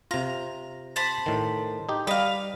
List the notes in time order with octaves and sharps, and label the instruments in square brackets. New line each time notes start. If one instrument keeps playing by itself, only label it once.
[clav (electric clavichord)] C3 F4 [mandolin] A#5
[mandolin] C5 A5 B5
[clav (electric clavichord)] A2 D#3
D#4 G4
[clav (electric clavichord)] G3 D#5 [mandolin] B4 F5